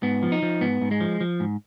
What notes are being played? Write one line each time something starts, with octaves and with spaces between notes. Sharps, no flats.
G#2 B3
F3
D#4
F3
G#2 B3
G#2
G#3
F3
F3
G#2